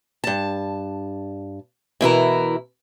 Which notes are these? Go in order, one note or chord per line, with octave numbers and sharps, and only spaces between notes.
G2 A5
B2 E3 E4 A#4